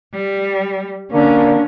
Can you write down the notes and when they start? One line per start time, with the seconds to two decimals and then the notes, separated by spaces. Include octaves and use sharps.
0.13 G3
1.12 D3 A#3 C#4 D4